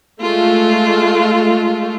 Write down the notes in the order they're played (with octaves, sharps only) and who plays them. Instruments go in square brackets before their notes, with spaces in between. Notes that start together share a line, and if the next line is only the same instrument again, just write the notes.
[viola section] G#3 A3 F4